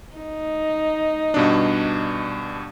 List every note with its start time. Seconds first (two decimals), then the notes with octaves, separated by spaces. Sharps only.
0.15 D#4
1.34 G2 B2 D4